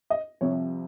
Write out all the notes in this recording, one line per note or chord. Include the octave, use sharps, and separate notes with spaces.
D#5
C2 C3 F3 C#5